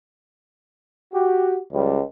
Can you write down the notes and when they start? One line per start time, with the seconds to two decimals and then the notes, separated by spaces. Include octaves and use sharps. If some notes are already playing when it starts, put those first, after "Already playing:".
1.12 F#4 G4
1.73 C#2 G3